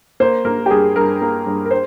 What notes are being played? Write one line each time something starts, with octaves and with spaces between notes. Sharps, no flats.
A#3 C5
A#3 A#4
G4
G2 G#4
G2 A#4
A#3
G2
A#4
C5